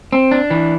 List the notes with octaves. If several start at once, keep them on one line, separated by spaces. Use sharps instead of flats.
C4
D4
E3